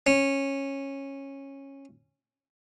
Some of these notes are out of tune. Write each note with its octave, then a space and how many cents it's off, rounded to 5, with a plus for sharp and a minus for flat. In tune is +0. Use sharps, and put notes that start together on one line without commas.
C#4 -15